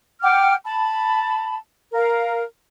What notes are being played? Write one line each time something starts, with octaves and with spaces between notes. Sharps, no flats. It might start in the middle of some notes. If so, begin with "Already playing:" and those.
F#5 G5 D6 F6
A5 B5
A#4 F5